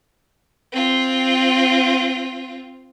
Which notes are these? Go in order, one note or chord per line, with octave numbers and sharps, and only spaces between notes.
C4 F4